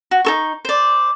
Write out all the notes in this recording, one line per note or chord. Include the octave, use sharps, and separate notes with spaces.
F#4
D#4 A4 C#6
C5 D5